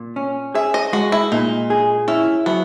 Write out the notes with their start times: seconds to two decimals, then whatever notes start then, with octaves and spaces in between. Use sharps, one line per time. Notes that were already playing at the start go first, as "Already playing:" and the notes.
Already playing: A#2
0.16 C#4
0.55 G#4 E5
0.74 D#5
0.93 G#3 F#4
1.12 E4
1.32 A#2 D#4
1.70 G#4
2.08 C#4 E4
2.46 F#3 B3